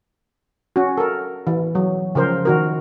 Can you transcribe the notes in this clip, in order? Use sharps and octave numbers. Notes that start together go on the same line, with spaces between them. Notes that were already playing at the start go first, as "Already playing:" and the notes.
C#4 F#4
A4 A#4
E3
F#3
C#3 F3 A#4 C5
D#3 F#4 A#4